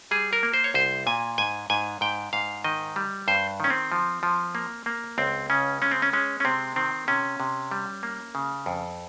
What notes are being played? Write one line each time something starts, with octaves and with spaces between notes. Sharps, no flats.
G3 G#4
A#4
A#3
C5
C#5
C2 C5
A#2 G#5
G#2 G#5
G#2 G#5
G#2 G5
G#2 F5
D#3 D#5
G3
G2 C5
D#3 C#4
C4
F3
F3
A#3
A#3
C#2 C4
C#3 C#4
G#3 C#4
C4
C#4
G#3 C#4
C#4
C3 C4
D#3 C4
C3 C#4
C3
G3
A#3
C#3
F2